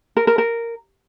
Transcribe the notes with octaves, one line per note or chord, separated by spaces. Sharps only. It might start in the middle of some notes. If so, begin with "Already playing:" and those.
A#4
A#4
A#4